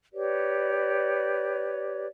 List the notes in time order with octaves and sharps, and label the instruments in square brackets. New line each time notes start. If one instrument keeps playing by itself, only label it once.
[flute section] G4 B4 C#5 D5